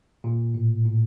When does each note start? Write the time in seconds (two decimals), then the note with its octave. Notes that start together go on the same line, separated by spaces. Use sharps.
0.24 A#2
0.54 A2
0.85 A2